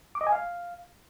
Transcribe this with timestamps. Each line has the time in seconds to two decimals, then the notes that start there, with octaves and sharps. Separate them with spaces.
0.15 D6
0.21 D#5
0.27 G#5
0.32 F5